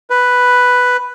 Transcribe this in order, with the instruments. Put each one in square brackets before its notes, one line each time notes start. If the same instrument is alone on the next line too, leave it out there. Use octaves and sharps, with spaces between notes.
[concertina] B4